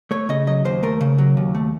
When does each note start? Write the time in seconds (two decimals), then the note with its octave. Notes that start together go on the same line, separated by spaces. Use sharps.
0.11 A3 C#5
0.29 C#3 D#5
0.47 F#3 D#5
0.65 D#2 C5
0.83 A3 A#4
1.01 C#3
1.18 F#3
1.37 D#2
1.55 A3